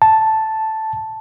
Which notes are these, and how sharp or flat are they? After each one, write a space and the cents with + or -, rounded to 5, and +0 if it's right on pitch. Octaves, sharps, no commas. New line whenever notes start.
A5 +0